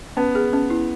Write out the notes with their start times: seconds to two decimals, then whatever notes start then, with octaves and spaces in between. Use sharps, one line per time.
0.17 B3 C#4
0.35 G#4
0.53 C#4
0.70 E4